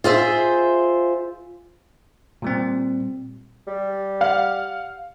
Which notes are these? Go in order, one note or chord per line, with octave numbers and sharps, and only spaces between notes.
F4 G#4 C5 E5
A#2 G3 C4
G3
F5 F#5